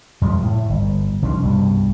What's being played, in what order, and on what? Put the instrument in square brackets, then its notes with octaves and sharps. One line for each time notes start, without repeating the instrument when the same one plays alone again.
[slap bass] F#2 F3 G3 G#3
A2
G1
C2 F3 C#4 D4
C2 G2 B2